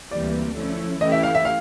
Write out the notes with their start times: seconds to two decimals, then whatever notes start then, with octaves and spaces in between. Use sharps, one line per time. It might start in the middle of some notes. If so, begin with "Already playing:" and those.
0.11 D2 C3 E3 G3 A#3 D5
0.56 F3 A3 C#4 E4
1.01 E3 A3 C#4 E4 G4 D#5
1.12 E5
1.23 F5
1.35 E5
1.45 F5